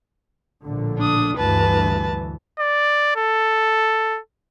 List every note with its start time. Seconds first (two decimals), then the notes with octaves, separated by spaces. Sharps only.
0.63 A#1 A2 D3
0.98 D4 D#6
1.37 D2 G2 E3 B4 A5
2.59 D5
3.16 A4